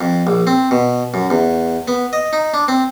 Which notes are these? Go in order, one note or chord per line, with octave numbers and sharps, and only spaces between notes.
F2
A#1
C4
B2
F#2
E2
B3
D#5
D#4
D4
C4